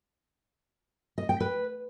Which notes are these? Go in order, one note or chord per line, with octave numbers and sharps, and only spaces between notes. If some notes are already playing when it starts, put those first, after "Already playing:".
D#5
G5
B4